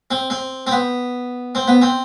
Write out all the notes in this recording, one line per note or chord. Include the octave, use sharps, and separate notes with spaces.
C4
C4
C4
B3
C4
B3
C4